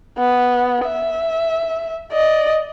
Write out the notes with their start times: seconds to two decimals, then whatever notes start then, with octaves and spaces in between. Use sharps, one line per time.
0.18 B3
0.86 E5
2.12 D5 D#5